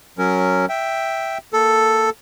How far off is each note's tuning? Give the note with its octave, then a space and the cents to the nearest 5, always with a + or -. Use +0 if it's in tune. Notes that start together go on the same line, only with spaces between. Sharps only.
F#3 +0 C#4 +0 A#4 -15
E5 +0 G5 +0
A#3 -10 A4 +0